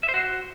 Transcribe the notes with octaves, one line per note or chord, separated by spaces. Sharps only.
E5
C5
F#4